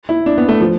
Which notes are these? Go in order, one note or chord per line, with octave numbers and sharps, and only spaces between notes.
E4
D4
B3
A3
F3